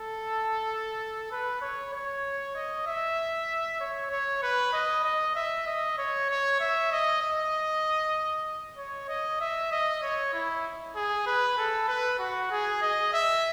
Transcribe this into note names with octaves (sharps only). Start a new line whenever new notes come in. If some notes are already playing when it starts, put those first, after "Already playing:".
Already playing: A4
B4
C#5
C#5
D#5
E5
C#5
C#5
B4
D#5
D#5
E5
D#5
C#5
C#5
E5
D#5
D#5
C#5
D#5
E5
D#5
C#5
E4
G#4
B4
A4
B4
F#4
G#4
D#5
E5